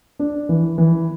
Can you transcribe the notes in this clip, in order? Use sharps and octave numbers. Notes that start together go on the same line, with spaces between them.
D4
E3
E3